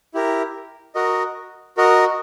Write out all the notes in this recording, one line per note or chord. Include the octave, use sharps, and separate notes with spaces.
E4 G4 A#4
F#4 A#4 D#5
F#4 A#4 D#5